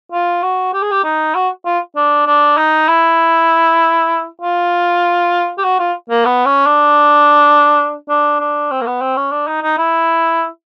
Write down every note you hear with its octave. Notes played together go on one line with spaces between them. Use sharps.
F4
F#4
G4
G#4
G4
D#4
F#4
F4
D4
D4
D#4
E4
F4
G4
F#4
F4
A#3
B3
C#4
D4
D4
D4
C4
A#3
B3
C4
C#4
D4
D#4
D#4
E4